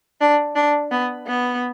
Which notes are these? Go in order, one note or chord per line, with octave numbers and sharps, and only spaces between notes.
D4
D4
B3
B3